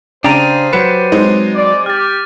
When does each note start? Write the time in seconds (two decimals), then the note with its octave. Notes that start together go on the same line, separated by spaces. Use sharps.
0.24 C#3 D4 G4 C5 G5 A#5 A6 D#7
0.73 F#3 B4 C#7 E7
1.12 G#3 C4 D#4
1.55 D5
1.86 G4 F6 A6